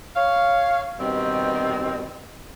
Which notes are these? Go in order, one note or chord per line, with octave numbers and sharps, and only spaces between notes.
C#5 F5
G2 B2 D#3 G3 C4